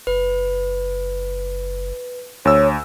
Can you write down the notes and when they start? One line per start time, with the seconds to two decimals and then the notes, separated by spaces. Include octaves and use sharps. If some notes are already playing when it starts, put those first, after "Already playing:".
0.07 F#1 B4
2.45 D2 C#5 E6